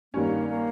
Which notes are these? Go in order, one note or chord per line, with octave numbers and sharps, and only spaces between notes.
G2 D#3 G3 A#3 C#4
A#3